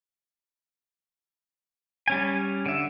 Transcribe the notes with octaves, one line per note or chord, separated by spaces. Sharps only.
G3 C#4 G#5
D3 E5